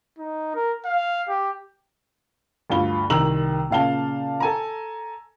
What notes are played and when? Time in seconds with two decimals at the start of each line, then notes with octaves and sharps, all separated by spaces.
0.19 D#4
0.55 A#4
0.85 F5
1.29 G4
2.70 D2 G2 F4 G7
3.10 C2 D#3 A#5 E6 F#7
3.70 A#2 C#3 F5 A5 G7
4.40 A4 G#5 A#5